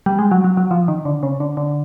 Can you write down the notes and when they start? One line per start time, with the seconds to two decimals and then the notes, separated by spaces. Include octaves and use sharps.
0.06 G3
0.19 G#3
0.31 F#3
0.44 F#3
0.57 F#3
0.71 F3
0.88 D#3
1.05 D3
1.23 C#3
1.40 D3
1.57 D3